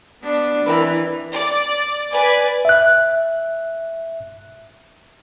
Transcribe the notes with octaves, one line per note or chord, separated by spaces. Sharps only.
B3 D4
E3 C4 A#4 B4
D5
B4 D5 G#5
E5 F#6